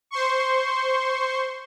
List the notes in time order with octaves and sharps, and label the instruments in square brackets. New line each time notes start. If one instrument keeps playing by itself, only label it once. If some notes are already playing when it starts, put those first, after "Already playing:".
[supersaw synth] C5 C6 C#6